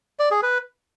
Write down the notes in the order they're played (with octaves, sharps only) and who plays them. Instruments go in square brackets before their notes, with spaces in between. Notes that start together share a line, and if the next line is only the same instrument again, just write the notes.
[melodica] D5
G#4
B4